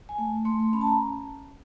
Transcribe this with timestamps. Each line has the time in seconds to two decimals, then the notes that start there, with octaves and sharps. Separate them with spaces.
0.09 G#5
0.18 A3
0.45 A3 C6
0.60 C6
0.73 C#4 B5
0.81 A5
0.87 A#5